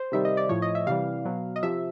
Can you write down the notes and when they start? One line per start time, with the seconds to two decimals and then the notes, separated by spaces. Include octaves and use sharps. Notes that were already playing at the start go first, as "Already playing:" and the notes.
Already playing: C5
0.12 C3 D#3 G3 E5
0.25 D#5
0.37 D5
0.49 A2 F3 C#5
0.62 D#5
0.75 E5
0.87 C3 E3 G3 F5
1.25 B2 F#3
1.56 D#5
1.63 C3 F3 E5